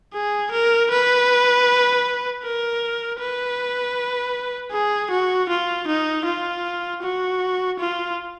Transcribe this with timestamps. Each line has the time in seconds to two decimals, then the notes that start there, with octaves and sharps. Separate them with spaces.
0.13 G#4
0.51 A#4
0.90 B4
2.43 A#4
3.20 B4
4.72 G#4
5.11 F#4
5.49 F4
5.87 D#4
6.25 F4
7.02 F#4
7.79 F4